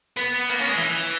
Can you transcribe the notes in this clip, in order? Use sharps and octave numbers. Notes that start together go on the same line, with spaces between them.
B3
A#3
C#4
G#3
E3